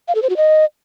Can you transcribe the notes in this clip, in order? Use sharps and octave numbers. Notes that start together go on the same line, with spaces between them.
F5
A4
C5
F#4
D#5